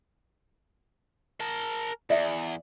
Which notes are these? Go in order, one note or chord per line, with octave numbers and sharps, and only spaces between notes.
A#4 A5
E2 D5 E5